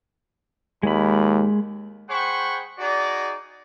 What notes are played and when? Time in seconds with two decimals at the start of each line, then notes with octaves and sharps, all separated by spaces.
0.83 D#2 G#3 B5
2.09 G#4 C5 F#5 G5 B5 C#6
2.79 D#4 F#4 G#4 D5